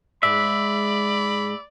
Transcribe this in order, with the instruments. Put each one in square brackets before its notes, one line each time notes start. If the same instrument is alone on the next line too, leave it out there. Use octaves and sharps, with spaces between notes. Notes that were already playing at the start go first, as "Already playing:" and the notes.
[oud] G#2 G#3 [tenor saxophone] D5 [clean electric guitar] E5 [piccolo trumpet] B5